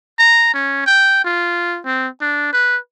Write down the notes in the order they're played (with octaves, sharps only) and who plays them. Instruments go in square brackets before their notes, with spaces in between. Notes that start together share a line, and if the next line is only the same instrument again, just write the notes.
[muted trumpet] A#5
C#4
G5
F4
C4
D4
B4